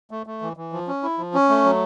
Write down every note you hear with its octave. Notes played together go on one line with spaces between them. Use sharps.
A3
A3
E3
E3
F3
C#4
E4
F3
C#4
A3
F#3